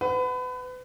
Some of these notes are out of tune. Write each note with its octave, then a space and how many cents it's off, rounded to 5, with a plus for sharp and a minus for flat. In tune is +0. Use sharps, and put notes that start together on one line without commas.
B4 +30 F#5 +0